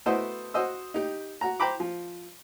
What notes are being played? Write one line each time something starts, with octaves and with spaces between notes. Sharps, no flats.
A3 B3 E4 F#4 C5 D#5
F#4 C5 D#5 E6
D#4 G4
F#4 A#5
C5 G5 A#5 B5 D6
F3